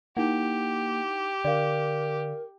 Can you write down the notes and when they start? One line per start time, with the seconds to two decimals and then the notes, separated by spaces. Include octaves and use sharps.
0.17 A#3 D#4 E4 G4 F#5
1.45 D3 A#4 D5 F5